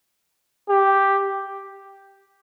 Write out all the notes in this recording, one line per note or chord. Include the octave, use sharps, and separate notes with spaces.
G4